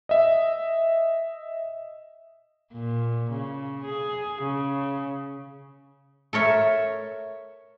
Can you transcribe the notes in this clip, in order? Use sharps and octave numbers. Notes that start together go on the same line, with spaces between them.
D#5 E5
A#2
C#3
G#4
C#3
A4 A#4 C#5 E5